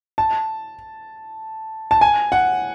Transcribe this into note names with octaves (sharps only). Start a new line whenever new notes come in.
A5
A5
G#5
F#5